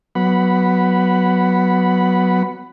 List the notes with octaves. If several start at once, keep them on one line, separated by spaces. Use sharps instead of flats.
F#3 B3 F#5 B5